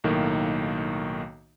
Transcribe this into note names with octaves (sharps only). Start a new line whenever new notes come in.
B1 A2 D#3 A#3